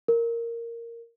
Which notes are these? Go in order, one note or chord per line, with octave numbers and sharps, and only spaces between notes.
A#4